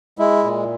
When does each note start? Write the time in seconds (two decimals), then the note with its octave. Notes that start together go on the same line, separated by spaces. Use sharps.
0.19 G#3 E4
0.44 A#2